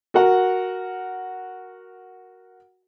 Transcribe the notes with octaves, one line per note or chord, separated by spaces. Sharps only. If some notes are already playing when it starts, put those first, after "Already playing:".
F#4 A#4 F#5